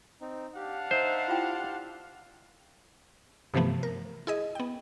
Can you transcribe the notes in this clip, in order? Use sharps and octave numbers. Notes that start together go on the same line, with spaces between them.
C4 D#4
D4 G4 F5 F#5
D#4 C5 E5
E4 F4 G4 G5 C6
G2 C3 E3 F3 A3 B3
A#4
E4 G#4 D#5
B3 G5